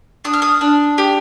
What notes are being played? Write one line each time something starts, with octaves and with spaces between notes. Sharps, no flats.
D4 D#6
F6
D#6
D4
G4